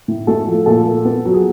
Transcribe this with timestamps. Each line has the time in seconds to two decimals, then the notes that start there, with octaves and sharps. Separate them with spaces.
0.08 A2
0.27 A3 A4
0.47 F3
0.66 A#2 A4
0.86 A#2
1.05 B3
1.25 F#3
1.33 G#4